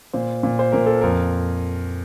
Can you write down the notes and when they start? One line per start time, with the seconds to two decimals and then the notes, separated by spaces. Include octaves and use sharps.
0.13 A#2 C5
0.43 A#2
0.59 C5
0.72 A#2 A#4
0.86 A4
1.01 F2 A#4